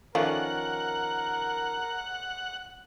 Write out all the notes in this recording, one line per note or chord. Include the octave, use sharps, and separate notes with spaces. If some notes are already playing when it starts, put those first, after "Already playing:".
D#3 F3 A3 C#4 A#4 D5 F5 F#5